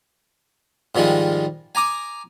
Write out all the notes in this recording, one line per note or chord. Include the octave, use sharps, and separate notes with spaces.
G#2 D#3 F3 G3 G#3
G#5 A#5 D6 D#6